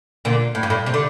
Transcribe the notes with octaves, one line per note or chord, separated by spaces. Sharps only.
A#2 D3
A2
G2
A2
C3
D3